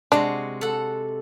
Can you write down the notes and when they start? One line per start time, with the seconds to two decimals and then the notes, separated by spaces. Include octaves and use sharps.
0.12 C3 G#3 D4 F#4
0.61 A4 F#5